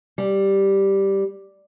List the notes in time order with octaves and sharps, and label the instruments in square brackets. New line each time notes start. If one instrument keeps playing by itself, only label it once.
[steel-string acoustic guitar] G3